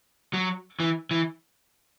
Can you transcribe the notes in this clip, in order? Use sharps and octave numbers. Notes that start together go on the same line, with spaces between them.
F#3
E3
E3